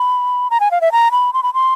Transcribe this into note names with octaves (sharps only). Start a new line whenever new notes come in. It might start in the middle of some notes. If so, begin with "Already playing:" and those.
Already playing: B5
A#5
G#5
F5
E5
A#5
B5
C6
B5
C6